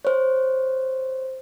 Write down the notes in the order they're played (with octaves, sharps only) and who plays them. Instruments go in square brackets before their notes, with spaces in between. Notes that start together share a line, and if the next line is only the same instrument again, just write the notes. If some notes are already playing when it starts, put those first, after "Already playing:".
[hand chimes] C5 C#5